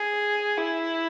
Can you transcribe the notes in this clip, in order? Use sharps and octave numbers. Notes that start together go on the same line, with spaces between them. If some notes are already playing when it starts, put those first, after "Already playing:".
Already playing: G#4
E4